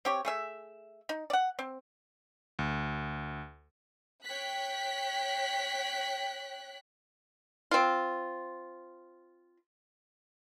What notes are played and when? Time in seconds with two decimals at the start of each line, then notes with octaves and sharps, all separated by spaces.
0.05 C4 G4 C#5
0.25 A3 G#4 E5
1.09 D#4
1.30 D5 F#5
1.59 C4
2.59 D2
4.24 C#5 G5 F#6 B6
7.71 C4 F4